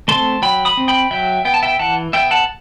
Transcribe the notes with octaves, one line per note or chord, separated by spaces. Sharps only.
A3 C4 A5 C6
F#3 G5 B5
B5 D#6
C4
G5 B5
F#3 E5 G5
B3 G5
A5
E5 G5
E3 F#5 A5
B3 E5 G5
F#5 A5